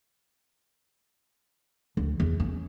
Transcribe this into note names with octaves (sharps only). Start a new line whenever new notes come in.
D2
E2
C#4